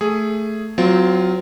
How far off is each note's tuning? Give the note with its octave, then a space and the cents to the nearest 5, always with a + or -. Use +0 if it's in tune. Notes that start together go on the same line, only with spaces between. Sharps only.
A3 +0 G#4 +0
F#3 +0 C4 -35 F4 +0